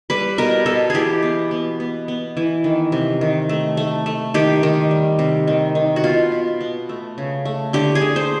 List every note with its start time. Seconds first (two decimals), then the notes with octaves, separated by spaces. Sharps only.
0.10 G3 B4
0.38 B2 A#4
0.66 B2 A4
0.90 E3 G4 G#4
1.23 B3
1.51 B3
1.80 B3
2.08 B3
2.37 E3
2.64 D#3
2.92 C3
3.21 D#3
3.49 A3
3.77 A3
4.06 A3
4.34 D#3 G4
4.63 D#3
4.91 G3
5.19 C3
5.47 D#3
5.75 D#3
5.96 F#4
6.04 B2 F4
6.32 B2
6.61 B3
6.89 A3
7.18 C#3
7.45 A3
7.73 D3 G4
7.95 G#4
8.01 D3
8.16 C5